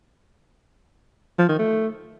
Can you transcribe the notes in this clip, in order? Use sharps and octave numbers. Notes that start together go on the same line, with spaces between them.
F3
D#3
A3